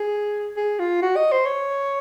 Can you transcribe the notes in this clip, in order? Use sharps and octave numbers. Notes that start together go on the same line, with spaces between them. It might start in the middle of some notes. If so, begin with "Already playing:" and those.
Already playing: G#4
G#4
F4
F#4
D#5
C5
C#5